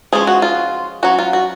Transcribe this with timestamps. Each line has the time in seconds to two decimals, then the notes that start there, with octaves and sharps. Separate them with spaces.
0.13 F3 G#3 C#4 G#4
0.27 F#4
0.42 F4
1.03 F#3 C#4 F#4
1.19 F4
1.33 F#4